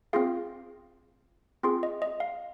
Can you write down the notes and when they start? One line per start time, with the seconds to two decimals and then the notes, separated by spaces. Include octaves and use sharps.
0.13 C4 F4 G#4 F5
1.63 C4 F4 G#4 C6
1.83 D#5
2.02 D#5
2.20 F5